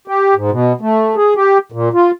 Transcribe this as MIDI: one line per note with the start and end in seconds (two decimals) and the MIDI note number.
0.08 0.34 67
0.35 0.51 44
0.51 0.73 47
0.81 1.15 57
1.16 1.34 68
1.36 1.58 67
1.72 1.89 46
1.93 2.11 65